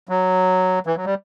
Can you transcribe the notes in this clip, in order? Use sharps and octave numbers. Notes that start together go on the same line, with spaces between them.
F#3
E3
F#3
G3